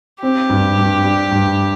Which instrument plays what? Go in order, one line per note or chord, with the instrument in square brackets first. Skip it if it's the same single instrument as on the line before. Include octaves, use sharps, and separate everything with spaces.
[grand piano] C4 [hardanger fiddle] G4
[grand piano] G2
G2
G3
G2